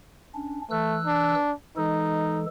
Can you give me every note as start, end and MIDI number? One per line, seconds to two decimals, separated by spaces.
0.34 0.61 61
0.34 0.61 62
0.71 1.35 52
0.71 0.99 57
0.71 1.35 88
0.71 1.35 90
1.05 1.52 62
1.77 2.46 52
1.77 2.46 56
1.77 2.42 63
1.77 2.46 69